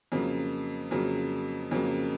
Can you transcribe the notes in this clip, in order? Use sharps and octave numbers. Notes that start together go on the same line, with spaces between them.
F2 C#3 F#3 A#3
F2 C#3 F#3 A#3
F2 C#3 F#3 A#3